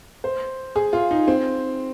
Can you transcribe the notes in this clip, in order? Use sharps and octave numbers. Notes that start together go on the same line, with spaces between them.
C5
G#4
F4
D#4
C4